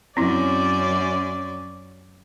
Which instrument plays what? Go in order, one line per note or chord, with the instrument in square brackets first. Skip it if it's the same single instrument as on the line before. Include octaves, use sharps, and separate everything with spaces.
[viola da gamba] F#2 C#4 D5 [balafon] C4 E4